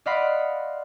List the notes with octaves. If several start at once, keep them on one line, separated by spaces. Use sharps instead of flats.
D5 D#5 F5 F#5 B5 C6